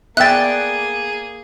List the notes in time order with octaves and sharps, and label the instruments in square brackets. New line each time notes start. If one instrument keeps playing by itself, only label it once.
[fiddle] A#3 G#4 [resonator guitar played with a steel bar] B3 D5 [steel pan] E5 G5 [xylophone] F#6 A6